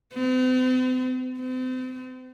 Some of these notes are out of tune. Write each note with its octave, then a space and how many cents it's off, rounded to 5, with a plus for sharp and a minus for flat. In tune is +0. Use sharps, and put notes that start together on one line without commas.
C4 -45
C4 -35